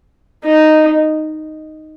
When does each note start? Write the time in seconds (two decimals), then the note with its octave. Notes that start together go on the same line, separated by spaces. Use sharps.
0.44 D#4